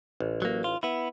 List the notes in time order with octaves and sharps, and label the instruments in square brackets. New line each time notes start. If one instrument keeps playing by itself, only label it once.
[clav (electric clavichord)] A1
[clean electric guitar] F#3 A#3
F4
B3 E4